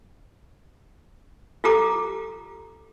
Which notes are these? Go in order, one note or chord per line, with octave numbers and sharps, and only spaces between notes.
F4 G4 A4 A#5 D6